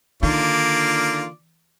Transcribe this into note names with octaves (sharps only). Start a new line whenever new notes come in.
D3 D#3 A#3 F4 D5